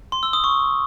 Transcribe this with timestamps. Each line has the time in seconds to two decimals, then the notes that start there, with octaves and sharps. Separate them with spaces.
0.12 C6
0.23 E6
0.33 D#6
0.44 C#6